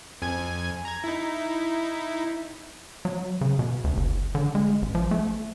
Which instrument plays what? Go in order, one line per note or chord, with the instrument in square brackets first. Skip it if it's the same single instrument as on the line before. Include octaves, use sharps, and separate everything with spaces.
[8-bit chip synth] F2 G#5 G#6
A#5 G#6
D#4 E4
[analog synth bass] F#3
C#3
B2
D2
F#1
D3
G#3
A1
F3
A3